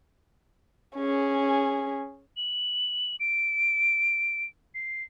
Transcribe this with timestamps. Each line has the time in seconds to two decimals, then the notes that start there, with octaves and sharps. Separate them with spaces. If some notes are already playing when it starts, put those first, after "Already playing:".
0.97 C#4 G#4
2.37 F#7
3.20 D7
4.75 C7